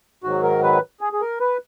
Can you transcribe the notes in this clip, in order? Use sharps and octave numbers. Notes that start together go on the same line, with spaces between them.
G#2 D#3 F#3 F#4
A#4
B4
G#4
G#4
A#4
B4